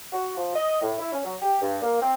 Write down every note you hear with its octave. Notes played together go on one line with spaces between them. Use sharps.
F#4
F3
D#5
A2
E4
C#4
F#3
G4
G2
A#3
C4